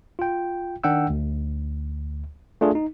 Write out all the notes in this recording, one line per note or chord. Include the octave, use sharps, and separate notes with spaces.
F4 G5
D#3 D4 F#5 G5 E6
D2
A3 D4 F4 G#4
D#4